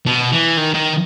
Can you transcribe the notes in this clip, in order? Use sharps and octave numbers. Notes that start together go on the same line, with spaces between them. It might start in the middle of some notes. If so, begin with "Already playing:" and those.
B2
E3
D#3
D#3